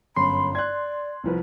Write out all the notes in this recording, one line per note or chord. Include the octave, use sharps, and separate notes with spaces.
G1 F#2 B5 C6
D5 F#6 G#6
C2 F3 B4